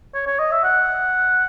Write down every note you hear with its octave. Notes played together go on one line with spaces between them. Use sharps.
C#5
C#5
D#5
E5
F#5